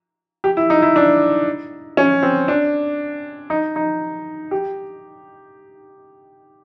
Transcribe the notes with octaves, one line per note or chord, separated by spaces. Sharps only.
G4
E4
D#4
E4
D4
C#4
C4
D4
D#4
D#4
G4